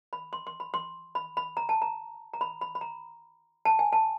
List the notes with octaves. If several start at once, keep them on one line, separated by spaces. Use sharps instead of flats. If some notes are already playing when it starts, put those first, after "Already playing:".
B5
C6
C6
B5
C6
B5
B5
A#5
A5
A#5
A#5
B5
B5
B5
A#5
A5
G#5
A5